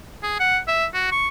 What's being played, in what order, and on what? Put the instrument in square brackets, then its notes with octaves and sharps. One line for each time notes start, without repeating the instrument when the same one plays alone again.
[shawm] G#4
F#5
E5
F#4
C#6